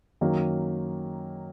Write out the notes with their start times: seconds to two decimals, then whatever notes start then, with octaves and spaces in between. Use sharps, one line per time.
0.21 F#2 D#3 F#3 A#3 C#4